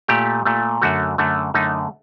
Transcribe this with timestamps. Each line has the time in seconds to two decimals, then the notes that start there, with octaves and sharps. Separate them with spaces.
0.08 A#2 A3 G4
0.45 A#2 A3
0.82 F#2 D3 A3 F#4
1.18 F#2 D3 A3
1.54 F#2 D3 A3 D#4